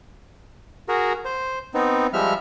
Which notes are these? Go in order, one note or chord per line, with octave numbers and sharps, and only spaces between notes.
F#4 G#4 A#4
C5
B3 C4 D#4
F3 G3 G#3 E5 F6